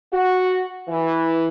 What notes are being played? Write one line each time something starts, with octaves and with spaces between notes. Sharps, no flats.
F#4
E3